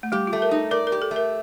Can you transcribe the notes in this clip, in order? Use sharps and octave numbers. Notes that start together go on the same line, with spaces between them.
A3
G3 G4
F4
A3
A#4
D#4
A#4 D5
A#4
G4
A4
A3
A#4